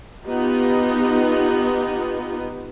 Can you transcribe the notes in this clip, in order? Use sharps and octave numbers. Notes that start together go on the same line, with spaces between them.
B3 D#4 F4 G4